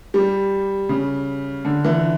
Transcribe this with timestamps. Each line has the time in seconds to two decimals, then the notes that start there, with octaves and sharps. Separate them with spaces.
0.14 G3
0.89 C#3
1.65 D3
1.85 E3